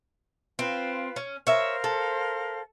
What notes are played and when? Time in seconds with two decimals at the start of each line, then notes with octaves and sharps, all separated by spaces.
0.59 C4 F4 B4 F5
1.16 C#4
1.47 A#4 C5 C#5 E5 F5
1.84 A4